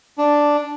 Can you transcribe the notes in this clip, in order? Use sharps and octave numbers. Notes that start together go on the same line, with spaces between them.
D4